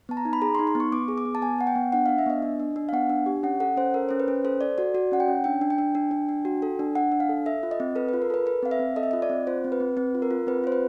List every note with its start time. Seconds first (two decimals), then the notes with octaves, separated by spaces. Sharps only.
0.09 B3 A5
0.17 A#5
0.25 D#4
0.33 B5
0.42 G#4 A#5
0.55 C6
0.59 D#4
0.67 C6
0.75 B3
0.80 C#6
0.92 B3 D6
1.08 G#4
1.18 D6
1.25 B3
1.35 A5
1.42 B3 G#5
1.59 B3 F#5
1.67 G5
1.75 B3
1.92 D4 F#5
2.06 D4 F5
2.18 E5
2.26 B3 D#5
2.42 D4
2.60 D4
2.76 D4
2.89 F5
2.93 B3 F#5
3.10 D4
3.26 G4
3.43 C#4 F#5
3.60 A4 F#5
3.77 C#4 C5
3.94 A4 A#4
4.09 C#4 C5
4.20 B4
4.28 C#4
4.45 A4 C5
4.61 A4 D5
4.78 F#4 D5
4.94 F#4 D5
5.12 C#4 F#5
5.20 G5
5.28 C#4
5.44 D4 G5
5.61 D4
5.70 G5
5.78 D4
5.95 D4
6.11 D4
6.29 D4
6.45 F#4
6.62 A4
6.79 D4
6.95 D4 F#5
7.12 D4
7.20 F5
7.29 A4
7.46 A4 E5
7.63 F4
7.71 D#5
7.80 C4
7.95 A4 B4
8.09 F4 B4
8.22 A#4
8.30 A4 B4
8.46 A4 B4
8.63 C4 F5
8.71 E5
8.79 C4
8.96 A4 D#5
9.03 E5
9.11 F4 D#5
9.22 D5
9.30 C4
9.47 F4 C5
9.64 C4
9.72 B4
9.80 C4
9.97 C4 B4
10.15 F4
10.22 A#4
10.31 F4
10.47 C4 B4
10.64 F4 C5
10.72 B4